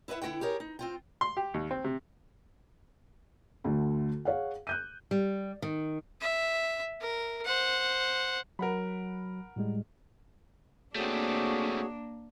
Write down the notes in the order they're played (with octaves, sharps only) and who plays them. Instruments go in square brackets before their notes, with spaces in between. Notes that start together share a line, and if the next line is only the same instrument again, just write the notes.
[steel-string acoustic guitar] E4 B4 D#5 E5 F#5
D3 E4 F#4 F#5 G5
G4 G#4 A#4 C#5
D#4
C4 F4 G5
[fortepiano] C6
G4
D#2
C4
C3
[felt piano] D2 D3 A3
G#4 C#5 F5 F#5
F#6 G6 D#7
[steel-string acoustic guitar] G3
D#3
[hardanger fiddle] E5
A#4
C5 F#5
[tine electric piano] F#3 [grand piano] A#4 F#5 B5
[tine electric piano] A2 G3 G#3
[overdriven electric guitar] A3 C4 [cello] A#3 D4 [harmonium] F#4 G#4 C#5